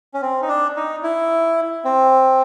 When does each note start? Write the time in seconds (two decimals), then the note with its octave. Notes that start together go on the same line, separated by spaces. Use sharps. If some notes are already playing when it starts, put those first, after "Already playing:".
0.14 C#4
0.22 C4
0.42 D#4
0.48 D4
0.77 D#4
1.03 E4
1.85 C4